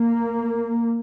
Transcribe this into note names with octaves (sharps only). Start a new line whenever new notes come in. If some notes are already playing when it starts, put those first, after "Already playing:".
Already playing: A#3